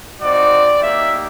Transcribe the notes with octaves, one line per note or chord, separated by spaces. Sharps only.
C4 D#4 F#4 D5
A#3 D#4 G4 E5